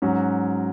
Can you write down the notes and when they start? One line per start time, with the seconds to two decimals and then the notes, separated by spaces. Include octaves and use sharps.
0.02 G#2 F#3 C#4 F#4